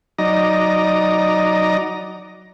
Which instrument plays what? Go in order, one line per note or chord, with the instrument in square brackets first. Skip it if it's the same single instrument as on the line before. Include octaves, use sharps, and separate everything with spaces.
[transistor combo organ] F#3 D#4 D5 D#5 A#5